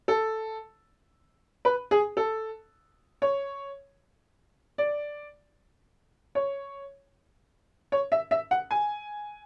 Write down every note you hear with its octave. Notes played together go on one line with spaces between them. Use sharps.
A4
B4
G#4
A4
C#5
D5
C#5
C#5
E5
E5
F#5
G#5